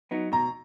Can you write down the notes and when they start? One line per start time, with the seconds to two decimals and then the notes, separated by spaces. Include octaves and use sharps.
0.11 F#3 B3 D#4
0.32 B2 A#5